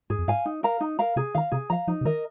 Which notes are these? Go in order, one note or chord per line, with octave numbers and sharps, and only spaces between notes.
G#2 G#4
F2
G#2 F5 G#5
D#4
A#4 F5 A#5
D#4
A#4 F5 A#5
C3 G#4
D#3 F5 A#5
C3 G#4
F3 F5 A#5
F3 D#4
C3
D#3 A#4 D#5